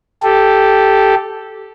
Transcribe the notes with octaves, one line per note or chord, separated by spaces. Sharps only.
G4 A4